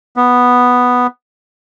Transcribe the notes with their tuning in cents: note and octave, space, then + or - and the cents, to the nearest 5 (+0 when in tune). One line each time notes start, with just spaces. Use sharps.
B3 +0